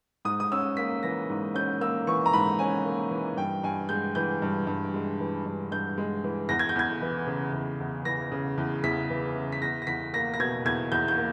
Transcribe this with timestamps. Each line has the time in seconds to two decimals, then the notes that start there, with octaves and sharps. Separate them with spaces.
0.25 G#2 D#6
0.40 D#6
0.52 C#4 E6
0.77 A#3 B6
1.03 E3 A#6
1.30 G#2
1.55 C#4 G6
1.81 A#3 E6
2.07 E3 C#6
2.26 A#5
2.33 G#2 B5
2.59 C#4 G#5
2.86 A#3
3.11 E3
3.37 G2 G5
3.63 G2 G#5
3.89 G#3 G6
4.15 E3 G6
4.42 G2
4.67 G2
4.94 G#3
5.20 E3
5.46 G2
5.71 G2 G6
5.98 G#3
6.24 E3
6.49 E2 A#6
6.59 G#6
6.69 G6
6.76 E2 G#6
7.02 E3
7.27 C#3
7.53 E2
7.80 E2
8.05 E3 A#6
8.32 C#3
8.58 E2
8.83 E2 B6
9.10 E3
9.35 C#3
9.52 B6
9.61 E2 A#6
9.82 A#6
9.87 E2 B6
10.13 A#3 A#6
10.34 A#6
10.40 B2 G#6
10.65 E2 G#6
10.92 E2 G6
11.08 G6
11.17 A#3